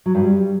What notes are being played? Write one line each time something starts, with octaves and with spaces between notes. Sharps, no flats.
F#3
G2
G3